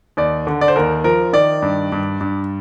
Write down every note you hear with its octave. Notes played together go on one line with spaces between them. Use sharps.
D#2 D5
D3
D5
C5
D#2 A#4
F3 A#4
D#3 D5
G2
G2
G2